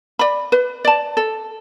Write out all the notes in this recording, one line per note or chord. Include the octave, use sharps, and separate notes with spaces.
D5 B5
B4
D5 A5
A4